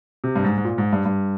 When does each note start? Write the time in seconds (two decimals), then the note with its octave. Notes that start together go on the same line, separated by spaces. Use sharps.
0.24 C3
0.36 G2
0.44 G#2
0.58 G#2
0.64 A#2
0.78 G#2
0.93 G2
1.05 G2